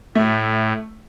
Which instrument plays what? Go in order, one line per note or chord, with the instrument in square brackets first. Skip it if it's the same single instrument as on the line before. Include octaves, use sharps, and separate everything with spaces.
[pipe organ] A2 [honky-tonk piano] A3